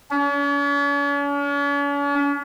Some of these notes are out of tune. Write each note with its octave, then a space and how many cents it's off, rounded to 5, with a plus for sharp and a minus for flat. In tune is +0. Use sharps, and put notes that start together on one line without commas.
C#4 +45